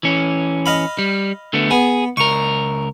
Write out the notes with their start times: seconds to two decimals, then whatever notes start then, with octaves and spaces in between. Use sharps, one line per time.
0.03 E3 C#4
0.66 D#5 F5 B5
0.99 G3
1.53 D3 A3 B3
1.71 B3 G#4
2.17 C#2 A#4 C#6